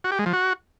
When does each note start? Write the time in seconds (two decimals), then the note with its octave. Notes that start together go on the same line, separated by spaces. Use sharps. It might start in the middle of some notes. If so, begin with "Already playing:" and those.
0.04 F#4
0.12 G4
0.19 G#3
0.26 F3
0.33 F#4